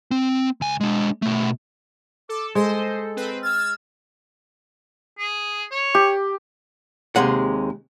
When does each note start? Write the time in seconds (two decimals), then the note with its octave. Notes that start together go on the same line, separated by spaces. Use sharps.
0.11 C4
0.61 C#2 G#5
0.81 G#3 D4
1.22 B2 A3
2.29 A4 D6
2.55 G#3 A4 C5 D#5
3.16 C4 B4
3.43 E6 F6 G#6 A6
5.19 G#4
5.71 C#5
5.95 G4
7.16 D#2 C3 G#3 F#5